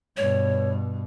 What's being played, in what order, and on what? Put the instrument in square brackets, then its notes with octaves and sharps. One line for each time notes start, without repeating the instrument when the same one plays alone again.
[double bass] G2 B2 [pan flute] C#5